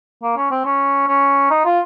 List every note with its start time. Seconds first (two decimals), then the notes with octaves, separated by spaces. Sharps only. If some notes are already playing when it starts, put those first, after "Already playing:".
0.23 A#3
0.37 C#4
0.51 C4
0.65 C#4
1.08 C#4
1.51 D#4
1.65 F4